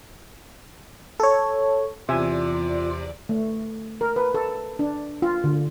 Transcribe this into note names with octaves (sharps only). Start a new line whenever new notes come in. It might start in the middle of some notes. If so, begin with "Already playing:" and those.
A4 C#5
E2 C3 F4 D5 E5 G#5
A3
A#4
B4
A4
D4
F4
D3